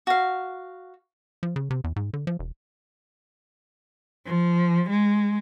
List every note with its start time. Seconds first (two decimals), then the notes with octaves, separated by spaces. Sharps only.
0.07 F#4 F5
1.43 F3
1.56 C#3
1.70 C3
1.84 E2
1.96 G#2
2.13 D3
2.27 F3
2.39 E1
4.26 F3
4.90 G#3